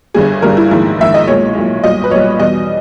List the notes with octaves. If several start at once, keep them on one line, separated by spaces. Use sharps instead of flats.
G1 G2 G3 G#4
G1 G2 G3 A#4
E4
A#1 G#2 D#3 E4
A#1 G#2 D#3 E5
D#5
B1 A#2 G#3 C#5
B1 A#2 G#3
B1 A#2 G3 D#5
B4
B1 A#2 G3 C#5
E2 B2 G3 D#5